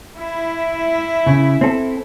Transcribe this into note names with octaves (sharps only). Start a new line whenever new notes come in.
E4
C#3
C4 A4